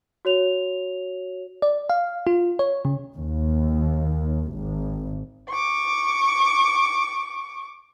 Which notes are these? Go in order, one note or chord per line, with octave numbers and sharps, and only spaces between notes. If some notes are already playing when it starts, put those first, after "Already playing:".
F#4 C#5 F7
D5
F5
F4
C#5
C#3
D#2
G#1
C#6 D6